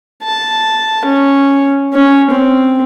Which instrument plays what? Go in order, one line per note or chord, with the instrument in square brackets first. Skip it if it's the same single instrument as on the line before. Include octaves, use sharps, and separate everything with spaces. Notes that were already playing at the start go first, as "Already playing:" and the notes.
[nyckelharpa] A5
C#4
C#4
C4